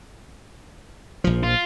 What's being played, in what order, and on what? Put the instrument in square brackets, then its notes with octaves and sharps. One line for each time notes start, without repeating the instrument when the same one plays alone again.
[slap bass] A#1 F3
[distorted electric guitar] F4